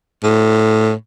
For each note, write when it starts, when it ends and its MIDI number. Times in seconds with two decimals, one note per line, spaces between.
0.24 0.92 45